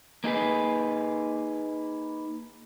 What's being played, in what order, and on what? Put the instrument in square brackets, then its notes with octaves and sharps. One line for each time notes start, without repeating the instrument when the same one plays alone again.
[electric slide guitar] A#3 D#4 G#4 B4